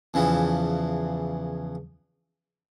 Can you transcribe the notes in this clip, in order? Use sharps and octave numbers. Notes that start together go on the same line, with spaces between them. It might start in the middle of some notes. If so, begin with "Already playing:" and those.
E2 C#3 E3 F3